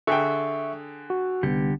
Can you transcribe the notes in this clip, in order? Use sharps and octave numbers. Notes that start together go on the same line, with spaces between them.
D3 G#4 E5 G5 C#6
F#4
C2 D3 G3 B3 G4